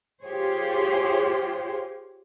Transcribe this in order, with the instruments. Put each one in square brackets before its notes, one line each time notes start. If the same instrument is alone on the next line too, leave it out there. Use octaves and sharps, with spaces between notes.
[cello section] F4 G4 G#4 C5 C#5